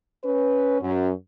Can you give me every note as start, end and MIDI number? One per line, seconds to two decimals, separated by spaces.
0.24 0.79 61
0.24 0.79 71
0.81 1.09 42